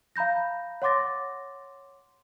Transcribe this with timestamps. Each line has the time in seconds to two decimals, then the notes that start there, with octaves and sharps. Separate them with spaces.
0.16 F5 A#5 B5 G6 A#6
0.82 C#5 F#5 C6 D6 A6 A#6